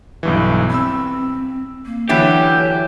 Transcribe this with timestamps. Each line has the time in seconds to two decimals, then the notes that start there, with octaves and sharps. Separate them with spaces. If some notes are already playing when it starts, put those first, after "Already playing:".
0.23 B1 G2 E3
0.70 C4 B5 E6
1.86 A#3
2.09 D3 E3 F#3 G4 C#5 E5